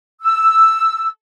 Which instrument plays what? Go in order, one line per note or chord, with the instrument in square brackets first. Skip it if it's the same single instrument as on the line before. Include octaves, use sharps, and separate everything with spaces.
[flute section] E6